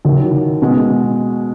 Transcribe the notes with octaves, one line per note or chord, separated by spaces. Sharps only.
D#2 D#3 F#3 A#3 E4
B2 G#3 B3 F#4